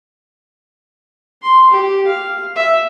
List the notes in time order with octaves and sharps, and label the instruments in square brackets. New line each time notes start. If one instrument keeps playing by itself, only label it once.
[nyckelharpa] C6
G4
F5
E5